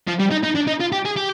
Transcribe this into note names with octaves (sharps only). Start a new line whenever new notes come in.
F3
G3
D#4
D#4
D4
D#4
F4
G4
G#4
G4